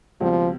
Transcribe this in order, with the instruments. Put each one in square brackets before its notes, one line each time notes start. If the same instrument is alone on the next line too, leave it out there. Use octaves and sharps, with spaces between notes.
[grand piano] C#2 B2 G3 C4 [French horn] F3